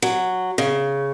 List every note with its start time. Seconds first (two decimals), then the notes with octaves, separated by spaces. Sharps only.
0.02 F#3
0.58 C#3